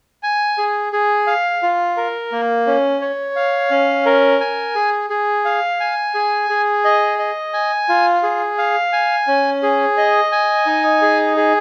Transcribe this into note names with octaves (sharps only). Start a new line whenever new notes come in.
G#5
G#4
G#4
F5
F4
A#4
A#3
C#4
C#5
F5
C#4
A#4
G#5
G#4
G#4
F5
G#5
G#4
G#4
D#5
D#5
G#5
F4
G#4
F5
G#5
C#4
G#4
D#5
G#5
D#4
G#4
G#4